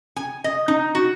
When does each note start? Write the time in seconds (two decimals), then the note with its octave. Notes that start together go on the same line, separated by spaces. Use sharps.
0.16 G#5
0.44 D#5
0.68 D#4
0.95 F#4